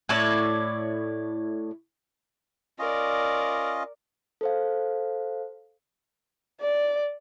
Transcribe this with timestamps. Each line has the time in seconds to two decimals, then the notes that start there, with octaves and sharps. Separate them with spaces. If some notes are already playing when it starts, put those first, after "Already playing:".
0.09 A2 E4 C#5 D5
2.79 C#4 F4 A#4 D5 D#5
4.41 A4 C5 F5
6.61 D5